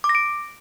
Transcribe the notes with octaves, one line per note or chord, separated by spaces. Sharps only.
D6
A#6
D7